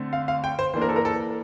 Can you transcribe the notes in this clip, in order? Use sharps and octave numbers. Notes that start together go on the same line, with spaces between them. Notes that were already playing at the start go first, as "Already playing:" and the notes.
Already playing: D3 A3 C4
F5
F5
G5
C5
E3 A#3 D4 C5
A#4
A4
A#4
A4